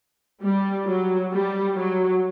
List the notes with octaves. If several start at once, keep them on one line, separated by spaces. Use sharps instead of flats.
G3
F#3
G3
F#3